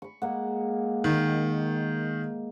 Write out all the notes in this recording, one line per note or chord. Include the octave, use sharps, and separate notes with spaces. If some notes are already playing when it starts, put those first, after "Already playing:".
B5 C#6
G#3 A#3 F#5
D#3